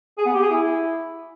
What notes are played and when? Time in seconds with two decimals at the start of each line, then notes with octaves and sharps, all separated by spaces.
0.18 G#4
0.26 B3
0.34 G4
0.42 G#4
0.51 E4